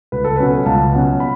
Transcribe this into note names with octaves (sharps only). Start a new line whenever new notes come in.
C#2 B4
A4
B2 F#3 C#4 B4
C#2 A5
B2 F#3 C#4
B5